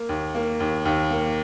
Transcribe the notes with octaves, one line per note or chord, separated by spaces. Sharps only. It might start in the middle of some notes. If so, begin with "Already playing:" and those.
Already playing: A#3
D#2
A#3
D#2
D#2
A#3